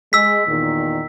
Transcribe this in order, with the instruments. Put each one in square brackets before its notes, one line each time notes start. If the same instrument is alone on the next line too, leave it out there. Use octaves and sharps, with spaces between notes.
[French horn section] G#3 [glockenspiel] E6 B6
[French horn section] E2 A#2 D#3